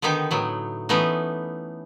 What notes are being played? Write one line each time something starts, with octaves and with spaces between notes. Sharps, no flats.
D3 D#3 B3 D#4 G4
A2 F#3 B3
E3 A3 B3 C#4 D#4